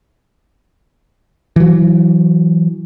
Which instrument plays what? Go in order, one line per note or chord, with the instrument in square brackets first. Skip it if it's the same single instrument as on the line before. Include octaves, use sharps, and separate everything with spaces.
[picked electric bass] E3 F#3